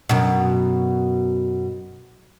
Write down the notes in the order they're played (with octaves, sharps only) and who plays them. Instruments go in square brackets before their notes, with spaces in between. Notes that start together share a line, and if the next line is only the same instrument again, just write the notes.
[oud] F#2 B2